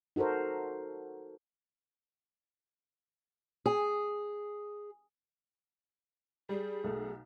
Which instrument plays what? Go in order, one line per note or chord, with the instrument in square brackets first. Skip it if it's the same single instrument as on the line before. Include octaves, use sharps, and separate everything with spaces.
[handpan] D#4 F#4 A4 A#4 C5
[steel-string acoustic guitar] G#4
[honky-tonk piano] G3 [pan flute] G#4
[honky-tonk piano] B1 A3